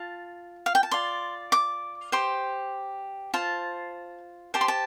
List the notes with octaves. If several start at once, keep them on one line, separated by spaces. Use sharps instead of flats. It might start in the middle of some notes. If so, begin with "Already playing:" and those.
Already playing: F4 A5
F5
G5
A5
F4 D5 C6
D6
G4 C5 C6
F4 C5 A5
G4 C5 A5
C6
A5